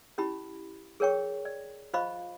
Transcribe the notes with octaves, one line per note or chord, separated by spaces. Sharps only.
C#4 E4 G4 B5
G#4 A#4 C#5 G5 C#6
D5
F4 C5 D#5 F5 B5 C#6